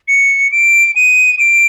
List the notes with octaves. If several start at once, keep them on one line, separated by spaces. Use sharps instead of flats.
C#7
D7
D#7
D7